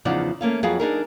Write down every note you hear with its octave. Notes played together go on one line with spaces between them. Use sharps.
E2 C#3 F3 D#4 D5 F#5
A3 A#3 C#4 F5
F2 F#3 B3 G#4 F5
D4 D#4 G#4 A#4